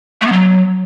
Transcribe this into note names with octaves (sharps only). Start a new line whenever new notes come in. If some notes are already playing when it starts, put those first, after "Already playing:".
A3
B3
F#3